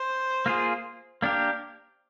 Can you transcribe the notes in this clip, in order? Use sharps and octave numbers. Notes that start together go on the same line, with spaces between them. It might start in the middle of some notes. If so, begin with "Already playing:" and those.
Already playing: C5
A#3 F4 G#4
A#3 D4 G4 A#4